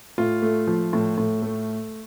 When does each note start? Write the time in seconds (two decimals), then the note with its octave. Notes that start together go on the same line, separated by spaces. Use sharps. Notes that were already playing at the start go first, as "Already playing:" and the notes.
0.18 A2 F4
0.42 A3
0.67 F3
0.93 A2
1.18 A2
1.42 A3